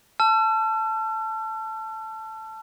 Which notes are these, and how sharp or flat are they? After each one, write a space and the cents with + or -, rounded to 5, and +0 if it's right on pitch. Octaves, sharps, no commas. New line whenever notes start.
A5 +0 E6 +45